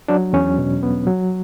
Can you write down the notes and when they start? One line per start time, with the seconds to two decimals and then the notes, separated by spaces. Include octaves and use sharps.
0.08 F#3 D4
0.33 E2 C#4
0.58 B2
0.83 B3
1.07 F#3